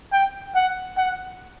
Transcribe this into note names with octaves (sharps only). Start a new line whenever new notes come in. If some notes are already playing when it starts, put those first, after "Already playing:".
G5
F#5
F#5